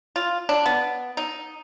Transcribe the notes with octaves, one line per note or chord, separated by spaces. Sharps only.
F4
D4
B3
D#4